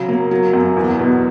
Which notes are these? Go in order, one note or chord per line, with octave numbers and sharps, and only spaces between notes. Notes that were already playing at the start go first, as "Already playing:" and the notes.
Already playing: C#3 F#3
A#3
F#3
F#2
E2
B2